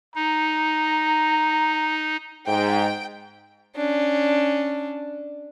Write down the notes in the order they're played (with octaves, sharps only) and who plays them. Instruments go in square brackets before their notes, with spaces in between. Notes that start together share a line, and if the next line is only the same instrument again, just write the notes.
[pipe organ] D#4 [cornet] A#5
[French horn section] G#2 [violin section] G5
[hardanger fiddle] C#4 D4